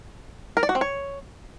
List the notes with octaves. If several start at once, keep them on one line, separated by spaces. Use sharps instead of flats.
A#4
D5
F#4
C4
C#5